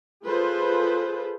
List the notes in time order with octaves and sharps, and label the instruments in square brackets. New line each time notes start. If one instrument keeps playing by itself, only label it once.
[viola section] F4 G#4 A4 B4 C5